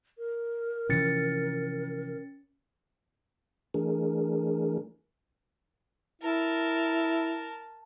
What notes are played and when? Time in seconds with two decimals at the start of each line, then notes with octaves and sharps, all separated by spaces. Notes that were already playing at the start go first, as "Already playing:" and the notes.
0.18 A#4
0.89 C3 E3 F3 C#4 A6 C#7
3.74 E3 A3 D4 G#4 A#4
6.21 E4 A#4 A5